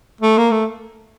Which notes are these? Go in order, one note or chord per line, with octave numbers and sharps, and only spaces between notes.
A3
A#3
A3